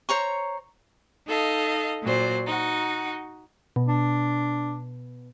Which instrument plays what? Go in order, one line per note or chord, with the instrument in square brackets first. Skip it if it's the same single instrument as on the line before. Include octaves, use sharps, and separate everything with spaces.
[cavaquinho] C5 C#5 A#5 C#6
[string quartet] D#4 A4 D#5 F5
A#2 F#3 C5 D5
D#4 F#4
[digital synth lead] B2
[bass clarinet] D4